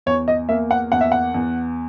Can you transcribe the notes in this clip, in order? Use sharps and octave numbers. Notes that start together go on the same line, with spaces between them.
E2 C#5
D#5
A#3 E5
F#5
E2 F#5
E5
F#5
E2